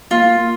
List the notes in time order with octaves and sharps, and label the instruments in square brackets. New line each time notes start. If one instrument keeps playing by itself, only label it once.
[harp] A#3 A#4 [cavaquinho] F4